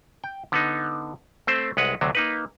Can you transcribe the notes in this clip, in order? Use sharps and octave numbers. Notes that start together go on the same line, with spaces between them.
G5
D3 B3 D#4
A3 C4 C5
C2 G#3 B4 F#5
D2 C3 F#3
A#3 D#4 B4